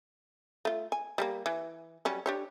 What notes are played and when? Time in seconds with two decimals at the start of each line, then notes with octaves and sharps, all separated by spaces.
0.65 A3 F4
0.92 G#5
1.18 G3 G#3 A#3
1.46 E3
2.05 F#3 G3 C#4
2.26 D4 G4 C#5